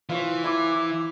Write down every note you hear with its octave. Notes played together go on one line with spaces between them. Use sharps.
E3 F4 C5 C#5
E4 D6